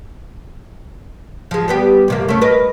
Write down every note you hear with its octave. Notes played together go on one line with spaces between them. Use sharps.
F3 G#3
G3 B3 G4
F2 C3 A#3
A3 C#4
A#4 B4 D#5